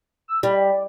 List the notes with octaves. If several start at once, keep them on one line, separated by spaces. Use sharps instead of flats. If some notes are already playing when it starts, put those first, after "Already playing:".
E6
G3 D5